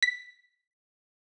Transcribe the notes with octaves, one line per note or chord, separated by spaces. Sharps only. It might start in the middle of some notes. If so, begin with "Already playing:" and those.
B6